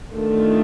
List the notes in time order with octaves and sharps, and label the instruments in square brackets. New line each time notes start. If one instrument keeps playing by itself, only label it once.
[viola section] D#3 A3 D4 F4